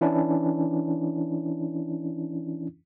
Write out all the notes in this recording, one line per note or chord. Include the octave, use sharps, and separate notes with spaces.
E3 C#4 D4 E4